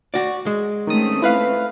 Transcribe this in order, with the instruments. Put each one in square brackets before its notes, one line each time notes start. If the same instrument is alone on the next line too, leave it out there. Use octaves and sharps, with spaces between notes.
[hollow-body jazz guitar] F#4 D5
G#3
[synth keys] D#3 D#6 [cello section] A3 C4 C#4
[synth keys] E4 B4 F5